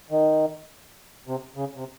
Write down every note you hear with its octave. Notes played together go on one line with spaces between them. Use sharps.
D#3
C3
C#3
C3